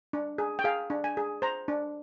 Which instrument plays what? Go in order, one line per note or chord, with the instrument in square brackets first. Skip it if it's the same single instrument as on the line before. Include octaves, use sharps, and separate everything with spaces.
[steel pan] D4
G#4
G5
G#4 F5
D4
G#5
G#4
C5 A#5
D4